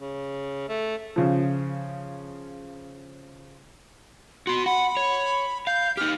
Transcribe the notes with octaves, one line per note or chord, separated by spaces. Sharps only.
C#3
A3
C#3 F3
F#4 B5 C6
F#5 B5
C#5
F5 G6
D#4 G4 F6